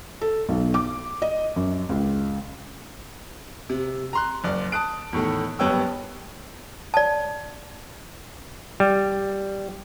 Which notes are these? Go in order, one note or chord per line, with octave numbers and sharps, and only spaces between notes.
A4
B1
D6
D#5
F#2
C#2
C3
A#5 C6 F#6
F#1 D5
A5 D#6 F#6 D7
E2 A2 D#3 A3
F#1 G2 B3 C#5 G5 E6
D5 A5
G3